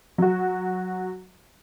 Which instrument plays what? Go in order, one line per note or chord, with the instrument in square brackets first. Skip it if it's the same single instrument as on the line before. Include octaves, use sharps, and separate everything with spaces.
[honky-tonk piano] F#3 F#4